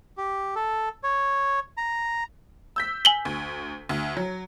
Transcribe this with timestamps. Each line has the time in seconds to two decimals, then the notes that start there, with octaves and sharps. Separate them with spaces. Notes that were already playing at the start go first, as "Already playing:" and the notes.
0.18 G4
0.56 A4
1.03 C#5
1.77 A#5
2.76 E6 G6 B6
3.05 G#5 F#7 G7
3.25 D2
3.89 D2
4.17 F#3